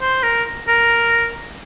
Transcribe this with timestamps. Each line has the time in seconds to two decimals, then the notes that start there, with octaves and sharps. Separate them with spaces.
0.01 C5
0.23 A#4
0.68 A#4